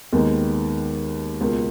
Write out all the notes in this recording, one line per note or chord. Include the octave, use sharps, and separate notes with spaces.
D#2 D#3 G#3 B3
C#2 B2 A#3 F4